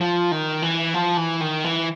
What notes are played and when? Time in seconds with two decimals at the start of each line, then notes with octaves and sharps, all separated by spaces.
0.01 F3
0.32 D#3
0.62 E3
0.94 F3
1.17 E3
1.41 D#3
1.64 E3